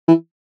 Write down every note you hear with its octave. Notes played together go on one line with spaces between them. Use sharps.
E3